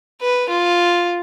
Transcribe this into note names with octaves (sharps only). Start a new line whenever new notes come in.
B4
F4